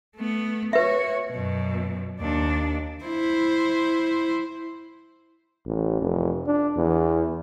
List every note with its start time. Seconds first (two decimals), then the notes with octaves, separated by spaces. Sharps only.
0.16 A3 B3
0.73 F#4 B4 C#5 E5
1.31 F#2 B2
2.20 D#2 D4
3.04 E4 C5
5.66 A1
6.01 F1
6.46 D4
6.76 E2